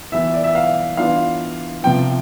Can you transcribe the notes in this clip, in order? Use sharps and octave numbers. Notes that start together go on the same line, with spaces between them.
E3 B3 E4 E5
D5
E5
F5
E3 B3 D4 F4 F5
C3 F3 B3 G5